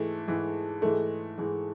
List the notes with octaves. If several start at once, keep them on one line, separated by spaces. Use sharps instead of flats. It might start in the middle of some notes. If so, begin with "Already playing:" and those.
Already playing: G#2 E3 G#3 A3
G#2 E3 G#3
G#2 E3 G#3 A3
G#2 E3 G#3